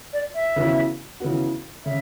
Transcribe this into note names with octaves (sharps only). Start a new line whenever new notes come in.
D5
E5
C#3 E3 B3 F#4
C#3 E3 B3 F#4
C#3 E5